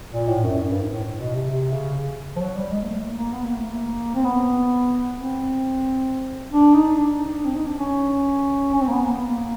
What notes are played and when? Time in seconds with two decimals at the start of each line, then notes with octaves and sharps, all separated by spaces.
0.13 A#2
0.29 A2
0.43 F#2
0.58 F#2
0.70 G2
0.81 G#2
0.92 A2
1.04 A2
1.19 B2
1.35 C3
1.50 C3
1.73 C#3
2.36 F3
2.41 F#3
2.56 G3
2.71 G#3
2.82 A#3
2.87 A3
3.02 A#3
3.17 A#3
3.33 B3
3.45 A#3
3.57 A3
3.68 A#3
4.15 C4
4.24 B3
5.16 C4
6.52 D4
6.75 D#4
6.98 D4
7.21 D4
7.44 C4
7.55 D#4
7.67 D4
7.78 C#4
8.74 C#4
8.81 C4
8.88 A#3
8.92 B3
9.04 A#3
9.15 B3
9.27 A#3